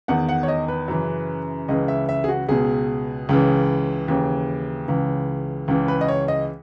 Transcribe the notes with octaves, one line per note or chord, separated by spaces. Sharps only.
E2 D#3 F#5
F#5
C#5
D#5
B4
F#2 C#3 E3
C#2 C#3 E3 D#5
E5
E5
G#4
F#4
C#2 B2 G#4
C#2 C#3 E3
D#2 C#3 E3
C#2 C#3 E3
C#2 C#3 E3
B4
D#5
C#5
D#5